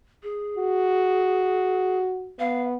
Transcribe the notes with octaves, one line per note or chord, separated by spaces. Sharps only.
G#4
F#4
B3 F5